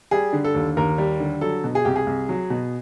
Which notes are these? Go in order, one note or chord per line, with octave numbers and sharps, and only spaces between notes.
G3 G#4
D3
A4
D#2
D#2 A#4
G3
D3
F#3 A4
B2
G#4
C2 G4
G#4
C2
F#3
B2